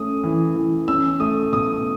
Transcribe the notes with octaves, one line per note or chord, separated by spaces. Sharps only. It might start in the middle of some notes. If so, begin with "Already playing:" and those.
Already playing: A3 C#4 D#6
E3
E3
C#4 E6
A3 D#6
B2 D#6